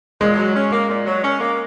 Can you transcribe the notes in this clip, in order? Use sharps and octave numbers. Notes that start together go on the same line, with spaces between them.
A#2 G#3
F#3
C#4
A#3
A#2
F#3
C#4
A#3